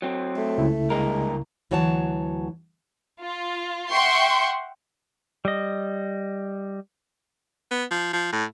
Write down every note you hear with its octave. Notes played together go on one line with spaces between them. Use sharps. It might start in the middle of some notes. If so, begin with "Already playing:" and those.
F#3 C4
A3
C#2 C#3 E4
G2 G#3 A#3 A#4
D2 E3 F#3 C#5 F#5 A5
F4
E5 F#5 G5 C6 C#6
G3 D#5
B3
F3
F3
A2